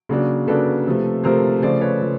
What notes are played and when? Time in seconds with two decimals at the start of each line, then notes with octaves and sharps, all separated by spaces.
0.09 C#3 F#3 A#3 D4
0.47 C#3 F#3 A#3 D4 A4 B4
0.87 C3 F3 A3
1.24 C3 F3 A3 A#4 C5
1.62 C#3 F3 A3 C5 D5
1.81 B4 C#5
2.01 C#3 F3 A3